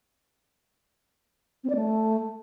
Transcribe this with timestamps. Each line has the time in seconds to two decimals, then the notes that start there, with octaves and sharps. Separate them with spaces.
1.64 C4
1.70 D5
1.75 A3